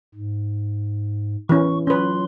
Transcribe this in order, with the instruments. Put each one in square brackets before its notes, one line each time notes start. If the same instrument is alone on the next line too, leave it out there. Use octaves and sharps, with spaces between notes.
[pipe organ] G#2
[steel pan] E3 C#4 [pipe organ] C#6
[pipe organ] F#3 F4 C6 [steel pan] C#4 B4